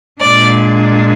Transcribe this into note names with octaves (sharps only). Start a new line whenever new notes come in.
A#2 G#3 D4 D5